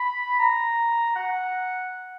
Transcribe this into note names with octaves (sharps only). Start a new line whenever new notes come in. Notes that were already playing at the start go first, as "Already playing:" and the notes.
Already playing: B5
A#5
F#5